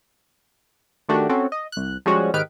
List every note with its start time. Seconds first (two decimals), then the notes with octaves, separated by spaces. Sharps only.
1.09 D#3 A3 D4 F#4 G4
1.29 C4 C#4 F#4 A4
1.52 D#5
1.72 C2 F#6
2.06 F3 G3 G#3 C#4 F#4
2.34 G#2 D#3 G4 B4 F6 D7